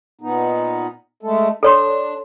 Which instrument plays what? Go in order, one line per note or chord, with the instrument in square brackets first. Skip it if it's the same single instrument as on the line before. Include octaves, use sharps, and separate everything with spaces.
[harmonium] A#2 B3 D#4
G#3 A3 A4
[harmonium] D4 [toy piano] A4 C#5 C6